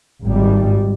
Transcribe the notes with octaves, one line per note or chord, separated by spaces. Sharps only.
G#1 G#2 G3